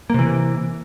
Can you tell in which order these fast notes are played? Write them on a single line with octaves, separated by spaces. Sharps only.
A#3 C3 E3